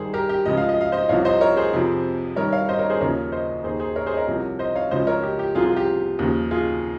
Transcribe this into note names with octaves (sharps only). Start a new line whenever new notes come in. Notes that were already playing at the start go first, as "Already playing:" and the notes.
Already playing: G2 D#3 G#4 C5
G4 A#4
G4
C#2 C#3 F3 D#5
F5
D#5
F5
C5 D#5
C2 C3 F3 C#5 F5
C5 D#5
A#4 C#5
G#4 C5
F2 C3 F3
G2 D#3 A#4 C#5
C#5 F5
C5 D#5
A#4 C#5
G#4 C5
D#2 C#3 F3 A#4 C#5
C5 D#5
D#2 D#3 G#4 C5
G#4 C5
A#4 C#5
G#4 C5
D#5
A#4 C#5
C2 C3 F3
C5 D#5
C#5 F5
C#2 C#3 F3 C5 D#5
A#4 C#5
G4
G4
C2 C3 F3 F4 G#4
F4
G4
D#2 C#3 F3
F4 G#4